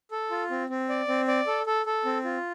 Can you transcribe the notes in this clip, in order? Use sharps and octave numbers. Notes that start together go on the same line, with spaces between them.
A4
F4
C4
C4
D5
C4
D5
A4
A4
A4
C4
F4